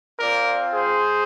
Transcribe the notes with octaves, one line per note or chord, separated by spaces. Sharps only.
C4 F4 A#4 D5
G#4 C5